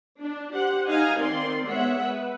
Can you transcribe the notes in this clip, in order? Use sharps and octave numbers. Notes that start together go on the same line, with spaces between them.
D4
G4 C5 F#5
D#4 F5 G#5 A#5
D#3 C4 D5 C6
G#3 B3 C#5 E5 F#5
B4